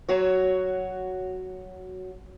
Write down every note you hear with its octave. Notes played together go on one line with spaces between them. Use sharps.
F#3 F#4 C#5